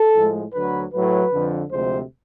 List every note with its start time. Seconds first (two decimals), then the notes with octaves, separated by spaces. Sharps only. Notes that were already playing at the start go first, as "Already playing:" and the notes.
Already playing: A4
0.15 A2 F3 G#3
0.53 D2 D3 F#3 B4
0.92 A2 F#3 A3 B4
1.32 F2 D3 F3
1.70 D2 C3 F3 G#3 C5